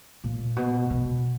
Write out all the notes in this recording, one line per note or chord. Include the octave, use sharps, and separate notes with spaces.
A#2
B2
B2